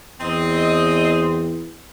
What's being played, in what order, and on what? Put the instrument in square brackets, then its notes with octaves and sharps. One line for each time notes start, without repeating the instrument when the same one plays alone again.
[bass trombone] E2 [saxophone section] C4 D#5